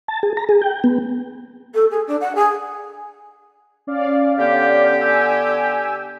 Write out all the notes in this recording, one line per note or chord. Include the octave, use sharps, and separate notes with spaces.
A5
G#4
A#5
G#4
G5
B3
A4
G#4
D4
F#5
G#4
C#4 D5 F5
D3 B3 G4
G#5 E6